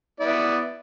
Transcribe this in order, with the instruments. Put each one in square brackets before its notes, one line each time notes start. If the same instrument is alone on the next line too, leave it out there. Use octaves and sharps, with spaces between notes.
[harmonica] B3 E4 D5